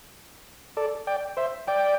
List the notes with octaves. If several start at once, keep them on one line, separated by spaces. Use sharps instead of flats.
A4 D5
D5 G5
C5 E5
D5 G5